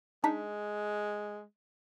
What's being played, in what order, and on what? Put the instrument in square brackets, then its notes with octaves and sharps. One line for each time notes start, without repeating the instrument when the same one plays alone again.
[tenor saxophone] G#3 [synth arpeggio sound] D4 D#4 B6